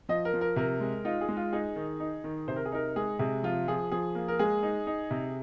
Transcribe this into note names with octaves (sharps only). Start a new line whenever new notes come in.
F3 D#5
A#4
F3
A#4
C3 A#4
G#3
D#4 F4
G#4
G#3
F4
D#4 G#4
D#3
D#4
D#3
C3 C5
A#4
G#4
D#4 A#4
G#3 G#4
C3 G#4
F3 F4
F3 G#4
F3 G#4
A#3
A#4
G#3 G#4
D#4
D#4
C3